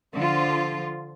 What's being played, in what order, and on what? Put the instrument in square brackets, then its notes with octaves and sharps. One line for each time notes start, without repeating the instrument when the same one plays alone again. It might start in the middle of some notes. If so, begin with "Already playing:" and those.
[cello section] D3 F3 F4